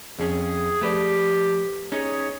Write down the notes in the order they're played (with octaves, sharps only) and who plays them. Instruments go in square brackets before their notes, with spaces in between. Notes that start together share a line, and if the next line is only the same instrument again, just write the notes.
[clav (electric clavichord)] F2 C#4 [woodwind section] G#4
[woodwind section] F3 G4 [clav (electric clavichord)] A3 B4 D5
[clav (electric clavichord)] C#4 D#4 [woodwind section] G#4 C#5